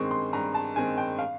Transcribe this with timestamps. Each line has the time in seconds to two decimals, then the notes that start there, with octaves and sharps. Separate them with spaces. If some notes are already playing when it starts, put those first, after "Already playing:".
Already playing: G2 D#3 G#3 C4 C6 C#6
0.11 C6
0.33 G2 A#5
0.54 A5
0.76 D#3 G#3 C4 G#5
0.98 G5
1.19 F5